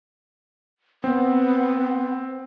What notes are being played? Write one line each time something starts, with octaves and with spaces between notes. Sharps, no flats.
B3 C4